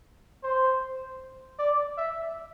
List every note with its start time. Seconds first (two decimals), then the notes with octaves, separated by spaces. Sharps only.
0.43 C5
1.59 D5
1.98 E5